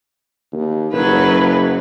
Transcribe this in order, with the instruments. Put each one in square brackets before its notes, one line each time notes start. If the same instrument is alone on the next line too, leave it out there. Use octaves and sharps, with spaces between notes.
[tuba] D#2
[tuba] F#1 [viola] F#3 B4